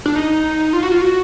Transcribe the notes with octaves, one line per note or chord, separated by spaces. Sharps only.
D4
D#4
F4
F#4
F4
F#4